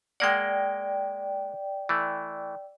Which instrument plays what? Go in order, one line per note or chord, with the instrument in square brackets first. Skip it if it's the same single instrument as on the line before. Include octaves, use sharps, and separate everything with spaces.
[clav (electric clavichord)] G#3 A#3 F#5 [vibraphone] D5 G5
[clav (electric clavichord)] E3 A3